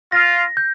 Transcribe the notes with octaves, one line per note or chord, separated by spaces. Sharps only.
F4 A#6
G6